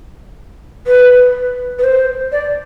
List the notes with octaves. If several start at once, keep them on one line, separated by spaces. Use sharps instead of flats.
B4
B4
C5
D5